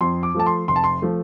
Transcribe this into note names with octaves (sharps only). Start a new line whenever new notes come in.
F2 C6
D6
F3 A3 A5
C6
F1 C6
A5
C6
F3 A3